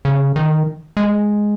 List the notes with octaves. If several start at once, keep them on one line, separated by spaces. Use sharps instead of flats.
C#3
D#3
G#3